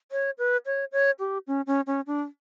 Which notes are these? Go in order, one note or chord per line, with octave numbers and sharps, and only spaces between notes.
C#5
B4
C#5
C#5
G4
C#4
C#4
C#4
D4